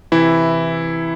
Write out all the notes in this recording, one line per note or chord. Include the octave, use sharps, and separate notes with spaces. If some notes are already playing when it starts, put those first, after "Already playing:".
C3 E3 E4 E5